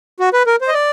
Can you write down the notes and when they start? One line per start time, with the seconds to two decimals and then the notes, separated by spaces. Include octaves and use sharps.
0.20 F#4
0.33 B4
0.47 A#4
0.61 C5
0.68 D#5
0.74 D5